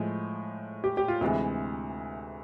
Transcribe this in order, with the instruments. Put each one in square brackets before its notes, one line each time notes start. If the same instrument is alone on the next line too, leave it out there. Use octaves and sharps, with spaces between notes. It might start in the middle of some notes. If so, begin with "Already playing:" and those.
Already playing: [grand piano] A2 F3 G#3
G4
G4
F4
D2 C3 E3 G#3